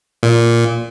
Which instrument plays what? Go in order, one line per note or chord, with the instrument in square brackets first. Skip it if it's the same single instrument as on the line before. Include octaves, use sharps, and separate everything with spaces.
[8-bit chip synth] A#2